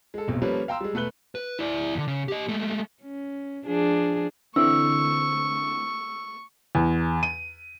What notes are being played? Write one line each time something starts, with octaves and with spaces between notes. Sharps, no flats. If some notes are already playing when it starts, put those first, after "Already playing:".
G#3 A4
D#1 B1 F2
F3 G3 A#3 C#4 A4 B4
F5 G5 A#5 C6 E6
G3 G#3
E1 A3 B4 F#6 G7
B4
E4 D5
E2 D3
C#3
G4 D#5
G#3 A3
C#4
F3 D4 G#4
D3 E3 C4 E4 C#6 E6
E2
D#7